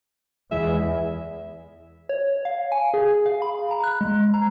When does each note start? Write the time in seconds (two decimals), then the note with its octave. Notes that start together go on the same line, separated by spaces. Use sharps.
0.51 E2 E3 G#3 E5
2.09 C#5
2.45 F5
2.72 G#5
2.94 G#4
3.26 F5
3.42 B5
3.71 A#5
3.84 F#6
4.01 G#3
4.34 A#5